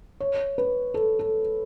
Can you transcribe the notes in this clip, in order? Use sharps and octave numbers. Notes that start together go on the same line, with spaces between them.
C#5
B4
A4
A4